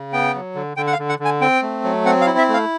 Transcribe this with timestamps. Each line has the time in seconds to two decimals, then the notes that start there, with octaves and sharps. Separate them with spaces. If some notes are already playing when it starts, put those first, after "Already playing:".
Already playing: C#3
0.13 B3 G5
0.34 F#3
0.55 D3
0.77 D3 G5
0.87 F#5
0.93 F5
0.99 D3
1.09 F#5
1.19 D3
1.25 G#5
1.41 C4 G5
1.62 A3
1.84 F#3
2.05 C4 F#5
2.21 F5
2.26 E4
2.38 E5
2.49 A3 F5